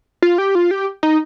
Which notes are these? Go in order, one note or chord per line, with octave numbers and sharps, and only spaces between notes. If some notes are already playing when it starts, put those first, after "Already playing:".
F4
G4
F4
G4
D#4